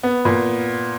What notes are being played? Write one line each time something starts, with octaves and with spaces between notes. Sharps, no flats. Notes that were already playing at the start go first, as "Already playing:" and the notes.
B3
A#2